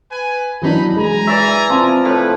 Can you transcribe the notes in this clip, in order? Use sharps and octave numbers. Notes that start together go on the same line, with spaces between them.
B4 G#5
E3 F#3 D4 D#4 B5
G#3 G#5 A#5
E3 D5 E5
F3 C4
A2 B4